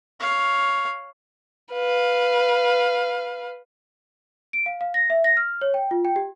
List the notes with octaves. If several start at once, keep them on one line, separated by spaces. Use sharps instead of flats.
C#5 F5
B4 F5
D7
F5
F5
A#6
E5
A#6
F6
C#5
G5
F4
G5
G4